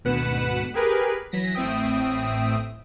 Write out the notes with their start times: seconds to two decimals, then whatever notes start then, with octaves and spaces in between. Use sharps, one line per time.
0.05 G#1 D2 B2 B4 F#5 E7
0.74 G4 G#4 A#4 B4
1.32 E3 F#3 A#6 B6
1.55 A1 A2 C4 E5 G5 D#6